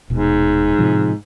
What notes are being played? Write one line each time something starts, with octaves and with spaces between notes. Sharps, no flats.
D#1 G#2 B2
A2 C3 F3